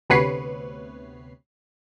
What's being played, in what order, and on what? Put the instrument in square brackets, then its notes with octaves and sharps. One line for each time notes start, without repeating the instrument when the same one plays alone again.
[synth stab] D2 C3 B3 B4 C#5 C7